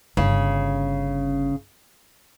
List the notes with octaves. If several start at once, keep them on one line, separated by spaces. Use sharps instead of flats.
G1 C#3 C#4